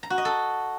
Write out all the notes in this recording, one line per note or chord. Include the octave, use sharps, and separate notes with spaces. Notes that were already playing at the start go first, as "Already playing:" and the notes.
A#5
F#4
D#5
A4